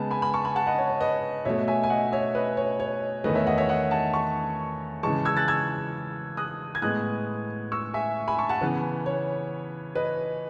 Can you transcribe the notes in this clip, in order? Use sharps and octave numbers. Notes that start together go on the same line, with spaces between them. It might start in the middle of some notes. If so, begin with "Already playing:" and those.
Already playing: C#3 G#3 B3 A5
G#5 B5
G#5 B5
A5 C#6
G#5 B5
F#5 A5
D#5 F#5
C#5
C#5
B4 D#5
B2 A3 C#5 E5
E5 G#5
G#5
D#5 F#5
C#5 E5
B4 D#5
C#5
C#5
E2 D#3 A3 B4 D#5
C#5 E5
D#5 F#5
C#5 E5
D#5 F#5
F#5 A5
A5 C#6
C#3 E3 G#3 A5 C#6
E6 G#6
F#6 A6
E6 G#6
D#6 F#6
G#6
A2 G#3 B3 D#6 F#6
C#6 E6
E5 G#5
G#5 B5
A5 C#6
F#5 A5
C#3 E3 B3 B4
C#5
B4 D#5